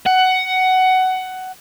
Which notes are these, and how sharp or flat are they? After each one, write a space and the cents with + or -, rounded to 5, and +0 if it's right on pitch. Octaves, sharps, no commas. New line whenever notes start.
F#5 +15